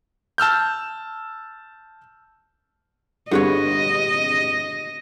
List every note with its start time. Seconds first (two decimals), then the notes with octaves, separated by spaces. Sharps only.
0.38 A5 E6 F6 G6
3.31 G1 D3 C4 G4 G#4 B4 C#5 D#5